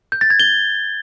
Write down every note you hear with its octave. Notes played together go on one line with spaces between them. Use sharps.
G6
A6
G#6
G7